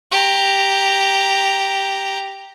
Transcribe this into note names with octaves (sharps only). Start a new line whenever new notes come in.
G4 A#5